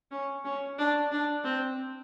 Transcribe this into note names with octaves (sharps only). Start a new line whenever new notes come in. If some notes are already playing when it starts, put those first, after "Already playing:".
C#4
C#4
D4
D4
C4